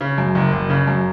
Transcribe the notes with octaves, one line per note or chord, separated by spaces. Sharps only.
C#3
F#2
F#1
F#1
C#3
F#2